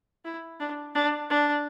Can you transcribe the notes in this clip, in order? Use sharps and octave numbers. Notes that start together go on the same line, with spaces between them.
E4
D4
D4
D4